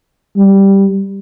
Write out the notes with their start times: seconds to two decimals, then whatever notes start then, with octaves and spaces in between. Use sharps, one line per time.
0.37 G3